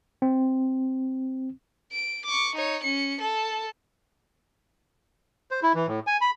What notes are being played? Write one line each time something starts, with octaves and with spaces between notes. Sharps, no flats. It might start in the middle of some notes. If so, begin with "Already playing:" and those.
C4
D7
C#6 D6
D#4 C#5
C#4 C#7
A4 A5
C5
E4
E3
A2
G#5
B5